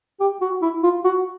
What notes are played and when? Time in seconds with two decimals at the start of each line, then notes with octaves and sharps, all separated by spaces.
0.20 G4
0.41 F#4
0.62 E4
0.83 F4
1.04 F#4